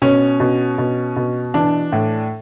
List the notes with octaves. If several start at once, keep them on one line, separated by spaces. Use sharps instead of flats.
B2 C#4
B2
B2
B2
E3 D4
A2